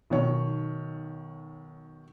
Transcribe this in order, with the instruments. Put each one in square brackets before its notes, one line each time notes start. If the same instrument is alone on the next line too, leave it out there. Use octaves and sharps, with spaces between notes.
[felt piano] B1 D#3 C#5